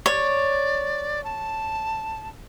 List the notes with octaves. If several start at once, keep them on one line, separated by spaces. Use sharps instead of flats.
C#5 D5
A5